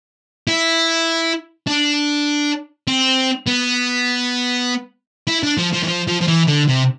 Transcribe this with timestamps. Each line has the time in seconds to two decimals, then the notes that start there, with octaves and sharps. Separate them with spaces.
0.48 E4
1.67 D4
2.88 C4
3.47 B3
5.27 E4
5.43 D4
5.57 F3
5.73 F3
5.83 E3
5.87 F3
6.07 F3
6.21 F3
6.27 E3
6.47 D3
6.68 C3